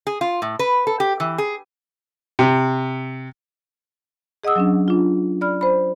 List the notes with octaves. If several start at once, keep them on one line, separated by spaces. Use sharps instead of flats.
G#4
F4
A2
B4
A4
G4
E3
G#4
C3
G#4 D#5 F#5 D#6 E6
F#3 C#4 D4
D4 F4
D5 B5 F6
C5 B5